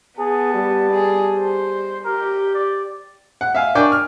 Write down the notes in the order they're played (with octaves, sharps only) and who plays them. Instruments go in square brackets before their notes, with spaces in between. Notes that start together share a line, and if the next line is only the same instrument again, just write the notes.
[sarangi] B3 [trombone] G#4 [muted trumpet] A5
[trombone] G3
[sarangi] G#4
C5
[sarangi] G4 [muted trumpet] A#4
[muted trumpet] D5
[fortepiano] F#5
E5 F5 G#5
D4 A#4 D5 G5 G#5 C#6
F6